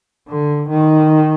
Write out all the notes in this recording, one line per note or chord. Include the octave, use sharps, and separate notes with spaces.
D3
D#3